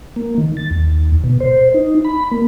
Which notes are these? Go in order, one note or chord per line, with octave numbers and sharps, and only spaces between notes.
A#3
D#3
A6
D#2
B2
C5
D#4
B5
A#3